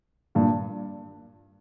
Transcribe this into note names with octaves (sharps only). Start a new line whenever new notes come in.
G2 A#2